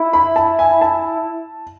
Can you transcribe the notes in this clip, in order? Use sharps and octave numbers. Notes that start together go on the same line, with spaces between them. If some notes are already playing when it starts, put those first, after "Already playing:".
Already playing: E4
B5
A5
G#5
A5